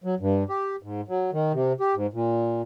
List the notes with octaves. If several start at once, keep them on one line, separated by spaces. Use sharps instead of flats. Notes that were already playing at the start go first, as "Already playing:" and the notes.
F#3
G2
G4
G#2
F#3
D#3
C3
G4
G#2
A#2